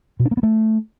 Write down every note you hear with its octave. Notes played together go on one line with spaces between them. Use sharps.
B2
D4
A#3
B3
A3